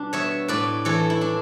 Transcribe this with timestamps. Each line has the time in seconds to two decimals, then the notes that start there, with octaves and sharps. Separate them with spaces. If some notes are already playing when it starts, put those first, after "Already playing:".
Already playing: B2 G3 D4
0.13 B3 C#5 E5
0.48 A2 B4 D5
0.85 E3 A4 C#5
1.10 E4
1.21 D4